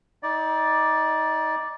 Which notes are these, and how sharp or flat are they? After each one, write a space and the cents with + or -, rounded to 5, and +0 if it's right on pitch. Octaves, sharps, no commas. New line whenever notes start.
D#4 +25 D5 +0